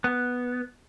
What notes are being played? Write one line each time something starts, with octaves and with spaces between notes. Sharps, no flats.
B3